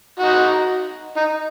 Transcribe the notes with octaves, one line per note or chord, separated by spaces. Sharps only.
D#4 F#4
D#4